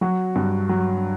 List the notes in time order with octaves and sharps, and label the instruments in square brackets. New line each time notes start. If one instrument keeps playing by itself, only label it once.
[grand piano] F#3 F#4
G2
F#3